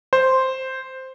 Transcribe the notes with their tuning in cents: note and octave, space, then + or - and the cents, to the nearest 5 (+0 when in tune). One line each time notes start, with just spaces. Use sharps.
C5 +0